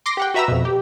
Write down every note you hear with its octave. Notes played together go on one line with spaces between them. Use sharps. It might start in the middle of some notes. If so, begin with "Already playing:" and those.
C6 D6 A#6 C7
G4 F#5 G5
F#4 B4 E5 A#5 B5 E6
F2 B2
G4